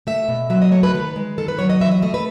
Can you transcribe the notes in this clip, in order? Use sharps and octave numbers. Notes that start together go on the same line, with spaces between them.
A3 E5
B2
F#3 E5
D#5
A3 C#5
B4
D#3 B4
G#3
D#3 A4
B4
F#3 C#5
D#5
E3 E5
D#5
A3 D#5
B4